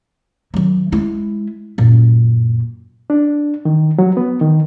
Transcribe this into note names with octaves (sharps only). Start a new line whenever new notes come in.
D#3 F#3
G#3 E4
F#2 A#2
D4
D#3
F#3
B3
D#3